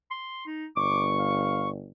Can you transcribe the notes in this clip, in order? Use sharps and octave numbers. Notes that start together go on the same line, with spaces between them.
C6
D#4
G1 C#6 D6
F5